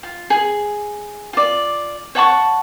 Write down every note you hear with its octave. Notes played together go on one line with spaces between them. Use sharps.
F4
G#4
F4 D5
C#5 F#5 A5 C#6